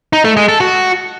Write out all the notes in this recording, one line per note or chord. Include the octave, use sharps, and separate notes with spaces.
D#4
A3
G#3
A4
F#4